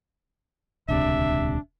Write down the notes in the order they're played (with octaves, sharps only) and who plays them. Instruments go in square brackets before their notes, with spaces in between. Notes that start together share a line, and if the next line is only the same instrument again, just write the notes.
[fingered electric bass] D#1 C#2 C3 [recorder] D4 [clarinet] E5